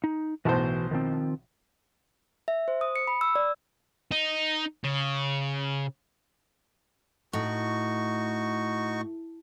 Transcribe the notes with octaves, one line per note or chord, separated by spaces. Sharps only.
D#4
B1 A2 E3 F#4 C5 A5
D#3 F3 C4
E5
C5
D#6
C#7
B5
E6
D5
D#4
C#3
A2 D#4 F#4 C#6